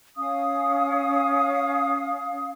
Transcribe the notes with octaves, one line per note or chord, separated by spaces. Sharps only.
C#4 F5 D#6